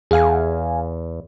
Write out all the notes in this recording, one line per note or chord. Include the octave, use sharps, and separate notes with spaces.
E2 G#4 F5 G#5